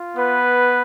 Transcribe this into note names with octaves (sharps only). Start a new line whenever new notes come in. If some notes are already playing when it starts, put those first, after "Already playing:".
Already playing: F4
B3 B4